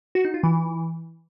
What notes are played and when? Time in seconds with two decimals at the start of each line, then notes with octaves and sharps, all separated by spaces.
0.15 F#4
0.25 D#4
0.34 F4
0.43 E3